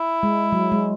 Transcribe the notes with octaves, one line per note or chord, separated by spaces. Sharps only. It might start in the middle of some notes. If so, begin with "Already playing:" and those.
Already playing: E4
G#3
F#3
G#3